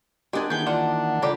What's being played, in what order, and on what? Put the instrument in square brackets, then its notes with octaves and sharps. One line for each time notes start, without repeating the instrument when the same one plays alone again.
[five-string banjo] G#3 G#5 [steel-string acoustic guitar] D4 G4 [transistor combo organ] F#4 A#4 D#5
[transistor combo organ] D#3 E3 A#3 [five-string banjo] B3 G#4 [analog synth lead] G6
[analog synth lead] D4 [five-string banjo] F4 [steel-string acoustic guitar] F#5
[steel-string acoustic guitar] C#3 [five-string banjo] F4 G4 D5 [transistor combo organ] A4 A#5